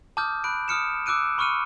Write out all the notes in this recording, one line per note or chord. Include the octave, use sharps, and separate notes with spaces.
A5 D6 D#6 F6 G6
B5 F#6 D7
D#6 F6 C#7 E7
D6 E6 F#6 D7 D#7
B5 C#6 D6 F6 C#7 D#7